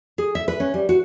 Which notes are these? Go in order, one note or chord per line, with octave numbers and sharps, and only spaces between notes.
G#4
E5
B4
C#4
G3
F#4